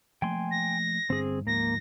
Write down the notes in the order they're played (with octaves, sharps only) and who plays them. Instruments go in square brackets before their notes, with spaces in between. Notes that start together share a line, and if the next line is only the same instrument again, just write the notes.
[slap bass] F3 A3 A#3 [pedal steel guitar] G5 G#5 C6
[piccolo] A#6
[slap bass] G2 D3 [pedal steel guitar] C4 G#4
[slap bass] D2 G#2 F3 [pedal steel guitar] A#3 [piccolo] A#6